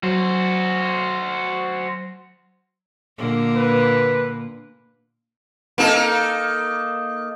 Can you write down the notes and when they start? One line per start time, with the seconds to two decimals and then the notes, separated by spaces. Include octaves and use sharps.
0.03 F#3 F#4 C5
3.18 A#2 D3 A#3
3.57 B4
5.78 A#3 D#4 A4